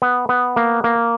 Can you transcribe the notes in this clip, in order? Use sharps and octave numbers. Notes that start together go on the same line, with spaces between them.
B3
B3
A#3
A#3